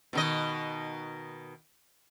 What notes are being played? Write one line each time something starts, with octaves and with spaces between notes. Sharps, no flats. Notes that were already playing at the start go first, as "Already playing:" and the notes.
B2 D#3 D#5